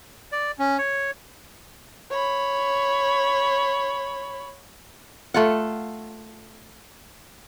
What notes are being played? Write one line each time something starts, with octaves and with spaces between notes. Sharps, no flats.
D5
C#4
C#5
C#5 B5
A3 F4 F#5